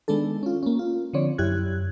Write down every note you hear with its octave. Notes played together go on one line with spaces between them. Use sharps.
D#3 G#3 B3 D4 A4
C#4 F4
A#3 C#4
F4
D3 F3 C4 C#5 D5
F#2 E4 G4 F#6 G#6